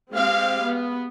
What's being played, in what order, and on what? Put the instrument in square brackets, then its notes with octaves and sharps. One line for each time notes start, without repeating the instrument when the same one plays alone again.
[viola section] G#3 C4 G4 F5
B3